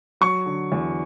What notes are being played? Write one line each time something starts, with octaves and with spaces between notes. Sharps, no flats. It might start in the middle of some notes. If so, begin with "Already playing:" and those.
F#3 C#6
D3
E2